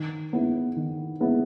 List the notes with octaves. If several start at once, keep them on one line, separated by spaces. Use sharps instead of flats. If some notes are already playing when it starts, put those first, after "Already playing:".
Already playing: D#3
G#3 B3 E4
D#3
G#3 B3 E4